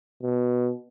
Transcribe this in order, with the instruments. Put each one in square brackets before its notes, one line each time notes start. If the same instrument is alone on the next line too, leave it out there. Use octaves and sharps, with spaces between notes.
[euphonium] B2